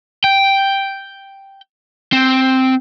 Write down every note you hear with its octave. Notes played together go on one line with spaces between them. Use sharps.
G5
C4